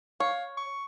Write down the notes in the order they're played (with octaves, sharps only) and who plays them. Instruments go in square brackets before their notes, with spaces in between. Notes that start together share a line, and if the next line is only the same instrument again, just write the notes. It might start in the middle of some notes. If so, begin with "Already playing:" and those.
[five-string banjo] C#5 [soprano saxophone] F5
[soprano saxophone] C#6